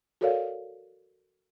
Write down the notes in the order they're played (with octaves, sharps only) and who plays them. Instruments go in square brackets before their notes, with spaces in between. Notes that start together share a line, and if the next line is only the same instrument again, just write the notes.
[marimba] F#4 A4 A#4 C#5 D5 F5